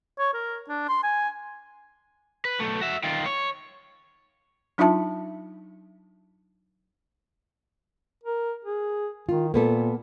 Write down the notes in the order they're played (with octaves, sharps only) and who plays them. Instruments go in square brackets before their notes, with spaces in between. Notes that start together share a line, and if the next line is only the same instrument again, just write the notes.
[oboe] C#5
A#4
D4
C6
G#5
[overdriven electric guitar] B4
B1 A3
F#4 E5
D#3 F4
C#5
[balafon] F#3 D4 D#4 F4 E5 A5
[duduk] A#4
G#4
[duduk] D#3 [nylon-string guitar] F4
[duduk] A#2 [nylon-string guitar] A#3 B3 A4